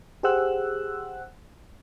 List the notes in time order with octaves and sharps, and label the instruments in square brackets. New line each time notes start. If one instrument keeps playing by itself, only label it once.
[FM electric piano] G4 G#4 C5 F#5 E6 F#6